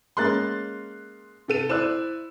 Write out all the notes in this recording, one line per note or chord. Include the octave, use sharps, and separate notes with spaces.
G#3 A#3 C#4 C6 F#6 A6
C3 A4 D#7
E4 C5 D5 E6 F#6 E7